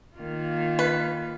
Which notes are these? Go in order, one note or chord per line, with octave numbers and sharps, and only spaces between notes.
D#3 A#3 F4
B4